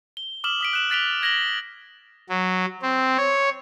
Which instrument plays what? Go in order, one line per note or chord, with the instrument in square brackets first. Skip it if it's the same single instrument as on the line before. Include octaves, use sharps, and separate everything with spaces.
[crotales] G7
D6 D#6 F6 E7 F#7 G7
D#6 B6 D7
F#6 E7 F#7
F#6 A6 B6 D7 F7 G7
G#6 A#6 D7 F#7 G7
[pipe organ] F#3
C4
C#5